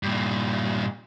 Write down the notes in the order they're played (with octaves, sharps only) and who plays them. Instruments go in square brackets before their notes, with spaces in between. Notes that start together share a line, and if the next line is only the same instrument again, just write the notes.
[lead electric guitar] G2 A#2